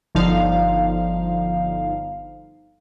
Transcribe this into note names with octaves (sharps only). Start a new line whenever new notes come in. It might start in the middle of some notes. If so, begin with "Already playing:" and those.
G1 D3 F3 D#4 F5